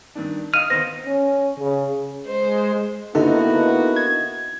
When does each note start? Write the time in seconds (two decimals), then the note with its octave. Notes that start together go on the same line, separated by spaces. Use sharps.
0.15 G2 D#3 D4
0.54 D#5 F5 D#6 F6 D#7
0.70 D#3 B3 C5 A#6
1.07 C#4
1.59 C#3
2.27 G#3 C5
3.15 D3 A#3 B3 D#4 E4 F#4 A4
3.96 G#6